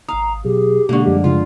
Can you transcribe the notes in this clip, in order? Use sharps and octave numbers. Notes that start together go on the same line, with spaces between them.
G#1 F5 A#5 D#6
B2 F#3 G4 G#4
B2 D3 G#3 A#3 C#6
F#2 F3 G3 G#3 G4
C#3 F4